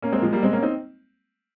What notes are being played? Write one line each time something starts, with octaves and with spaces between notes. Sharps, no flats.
A#3 C#4
G#3 C4
A#3
F3 G#3
G3 A#3
G#3 C4
A#3 C#4
C4 D#4